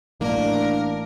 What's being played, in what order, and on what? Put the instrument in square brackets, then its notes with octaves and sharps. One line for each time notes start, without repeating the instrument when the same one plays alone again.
[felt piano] A1 [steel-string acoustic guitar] A#3 [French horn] D4 [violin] A#4